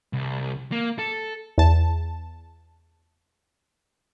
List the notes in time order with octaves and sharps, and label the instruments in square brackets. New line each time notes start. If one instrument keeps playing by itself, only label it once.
[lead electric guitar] C2
A#3
A4
[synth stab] E2 A5